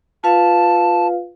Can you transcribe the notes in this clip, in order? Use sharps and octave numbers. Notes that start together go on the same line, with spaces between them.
F4 B4 F5 A5